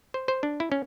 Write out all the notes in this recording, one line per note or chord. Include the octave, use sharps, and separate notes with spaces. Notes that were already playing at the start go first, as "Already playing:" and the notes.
C5
C5
D4
E4
C#4